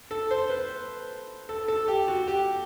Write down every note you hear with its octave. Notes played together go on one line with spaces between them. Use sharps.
A4
C5
B4
A4
A4
G4
F#4
G4